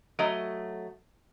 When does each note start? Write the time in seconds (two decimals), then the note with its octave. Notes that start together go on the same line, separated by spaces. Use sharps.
0.19 F#3 A3 D#5